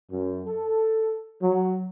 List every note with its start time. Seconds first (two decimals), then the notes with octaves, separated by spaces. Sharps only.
0.11 F#2
0.46 A4
1.42 F#3